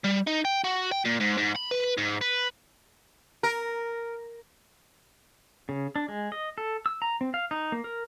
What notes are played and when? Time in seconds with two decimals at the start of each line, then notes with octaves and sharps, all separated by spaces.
0.04 G3
0.27 D#4
0.45 G5
0.64 F#4
0.91 G5
1.05 A#2
1.20 G#2
1.38 G#2
1.56 B5
1.71 B4
1.98 G#2
2.21 B4
3.43 A#4
5.69 C#3
5.96 D4
6.08 G#3
6.32 D#5
6.58 A4
6.86 E6
7.02 A#5
7.21 C4
7.34 F5
7.51 D#4
7.72 A#3
7.84 A#4